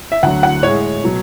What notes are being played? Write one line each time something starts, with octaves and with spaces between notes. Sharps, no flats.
E5
D2 D3 F#3 F#5
F#5
A2 G#3 C#5
B2 F#3